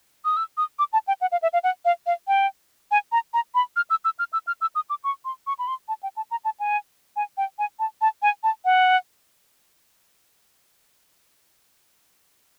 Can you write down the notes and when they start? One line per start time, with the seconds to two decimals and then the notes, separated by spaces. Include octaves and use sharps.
0.25 D#6
0.37 E6
0.57 D#6
0.79 D6
0.93 A5
1.08 G5
1.21 F#5
1.32 F5
1.42 E5
1.53 F5
1.64 F#5
1.85 F5
2.06 F5
2.28 G5
2.91 G#5
3.12 A#5
3.34 A#5
3.55 B5
3.76 F6
3.90 E6
4.05 E6
4.19 F6
4.33 E6
4.47 F6
4.61 E6
4.75 D#6
4.90 D6
5.04 C#6
5.25 C6
5.47 C#6
5.59 B5
5.68 C6
5.88 A5
6.03 G5
6.16 A5
6.31 A#5
6.45 A5
6.60 G#5
7.16 G#5
7.37 G5
7.59 G#5
7.79 A5
8.01 A5
8.22 G#5
8.43 A5
8.65 F#5